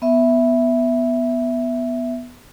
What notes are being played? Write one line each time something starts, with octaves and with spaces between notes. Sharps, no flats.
B3 E5